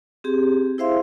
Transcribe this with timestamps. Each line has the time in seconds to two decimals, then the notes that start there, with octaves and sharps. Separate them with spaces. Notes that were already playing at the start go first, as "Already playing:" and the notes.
0.24 C4 G4 G#4
0.78 E4 G#4 C5 E5 F5 C6